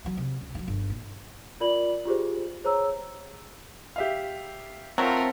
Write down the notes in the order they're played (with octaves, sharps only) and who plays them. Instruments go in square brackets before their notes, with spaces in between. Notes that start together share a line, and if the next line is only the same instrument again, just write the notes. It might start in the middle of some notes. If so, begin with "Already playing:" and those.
[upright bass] E3 F#3
C3
C#2
D#3 F#3
G1
A#2
[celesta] F4 A#4 D5 B5 F#7
F4 G4 G#4 C5
G#4 C5 C#5 A#5 E6
[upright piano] G4 E5 F5
[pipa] F#3 A3 [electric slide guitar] C4 [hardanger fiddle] F4 A#4